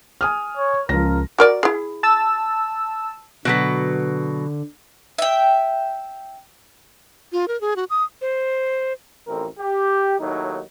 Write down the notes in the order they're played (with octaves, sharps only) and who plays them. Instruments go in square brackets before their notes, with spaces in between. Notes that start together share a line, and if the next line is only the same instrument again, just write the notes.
[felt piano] G#5 D#6 F6
[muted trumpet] C#5
[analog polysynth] C#2 [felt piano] F3 A#6 [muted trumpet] A#4
[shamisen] F#4 A#4 D5
E4 G#4
[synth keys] A5 E6
[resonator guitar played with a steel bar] B2 F#3 B4 [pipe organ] D3
[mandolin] E5 G5
[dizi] F4
A#4
G#4
F#4
D#6
[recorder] C5
[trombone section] A1 F2 E3 C4 A#4
G4
D#2 A2 F#3 D#4